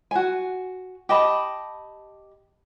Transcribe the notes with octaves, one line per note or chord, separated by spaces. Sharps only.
F#4 G#5
G4 D#5 A5 B5